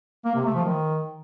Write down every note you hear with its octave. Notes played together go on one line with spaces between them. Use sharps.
A#3
C3
A3
F3
D#3